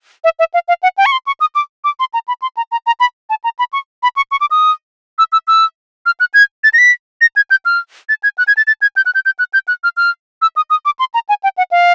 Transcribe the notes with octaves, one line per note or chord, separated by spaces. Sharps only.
E5
E5
F5
F5
F#5
G5
C#6
C6
C#6
D#6
D6
D6
C6
A#5
B5
C6
A#5
A#5
A#5
B5
A5
A#5
B5
C#6
B5
C#6
C#6
D6
D#6
E6
E6
E6
F6
F#6
G#6
A6
A#6
B6
A#6
G#6
G6
F6
A6
G#6
F#6
G#6
A6
A6
G#6
G6
F#6
G6
G6
F#6
G6
F#6
F6
F6
E6
D#6
D#6
D6
C6
A#5
G#5
G5
F#5
F5